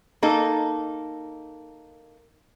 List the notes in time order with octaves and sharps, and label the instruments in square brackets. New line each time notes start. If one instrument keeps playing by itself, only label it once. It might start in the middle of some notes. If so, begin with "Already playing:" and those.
[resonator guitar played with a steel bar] A#3 D#4 A4